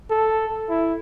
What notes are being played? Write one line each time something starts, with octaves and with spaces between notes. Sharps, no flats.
A4
E4